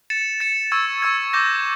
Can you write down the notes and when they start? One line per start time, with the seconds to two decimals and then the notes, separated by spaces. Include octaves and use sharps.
0.10 A6 C#7 E7
0.40 A6 C#7 E7
0.72 C#6 E6 G#6
1.02 C#6 E6 G#6
1.33 D6 G6 A#6